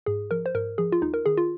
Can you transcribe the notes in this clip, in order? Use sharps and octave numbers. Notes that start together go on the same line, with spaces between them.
G#2 G#4
F3 A#4
C5
G#2 A#4
F3 G#4
F4
D#2 D#4
A#4
D#3 G#4
F4